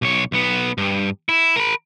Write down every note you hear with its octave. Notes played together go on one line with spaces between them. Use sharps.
B1 C#5
B1 B3
G2
E4
A#4 B5